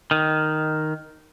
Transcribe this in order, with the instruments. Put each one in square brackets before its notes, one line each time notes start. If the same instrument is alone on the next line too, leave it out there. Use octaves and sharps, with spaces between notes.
[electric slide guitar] D#3